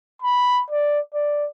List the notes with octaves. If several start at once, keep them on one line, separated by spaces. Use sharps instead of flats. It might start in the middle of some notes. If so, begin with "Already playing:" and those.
B5
D5
D5